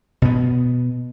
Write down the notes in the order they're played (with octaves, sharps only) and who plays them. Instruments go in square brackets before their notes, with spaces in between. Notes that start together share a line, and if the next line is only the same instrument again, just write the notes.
[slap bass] B2 B3